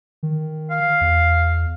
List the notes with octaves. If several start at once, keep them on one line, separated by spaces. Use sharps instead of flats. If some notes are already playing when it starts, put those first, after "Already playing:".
D#3
F5
E2